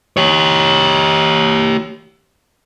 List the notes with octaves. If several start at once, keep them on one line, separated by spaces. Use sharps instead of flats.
G4 C#5